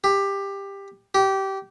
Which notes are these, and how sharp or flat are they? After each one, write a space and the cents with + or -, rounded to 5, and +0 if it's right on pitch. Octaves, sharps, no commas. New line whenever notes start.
G4 +15
G4 -20